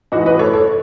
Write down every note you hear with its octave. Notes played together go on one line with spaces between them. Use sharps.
A1 A2 E3 D#4 F#4
B4 D#5
A4 C#5
A4 C#5